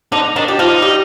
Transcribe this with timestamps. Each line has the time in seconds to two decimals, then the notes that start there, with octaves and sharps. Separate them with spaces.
0.12 D3 D4 D#4
0.36 D#3 D4 D#4
0.48 G4
0.59 F3 D#4 F4
0.82 G3 G4